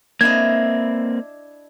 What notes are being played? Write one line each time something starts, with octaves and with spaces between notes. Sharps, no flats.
A#3 C4 D4 E4 D#5 G#6